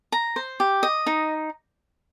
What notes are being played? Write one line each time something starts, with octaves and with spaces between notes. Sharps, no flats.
A#5
C5
G4
D#5
D#4